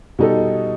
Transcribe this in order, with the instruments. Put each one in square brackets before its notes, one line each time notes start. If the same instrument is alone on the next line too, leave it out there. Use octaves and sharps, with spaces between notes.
[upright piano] B2 G3 D#4 A4